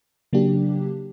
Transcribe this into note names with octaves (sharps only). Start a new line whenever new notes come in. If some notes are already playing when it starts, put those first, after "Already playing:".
C#3 F#3 A#3 D4 G4